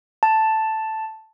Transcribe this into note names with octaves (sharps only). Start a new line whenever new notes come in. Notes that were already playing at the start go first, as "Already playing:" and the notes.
A5